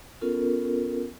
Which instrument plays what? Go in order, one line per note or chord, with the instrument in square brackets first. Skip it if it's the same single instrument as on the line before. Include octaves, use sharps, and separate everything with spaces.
[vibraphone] B3 C#4 F4 A4 A#4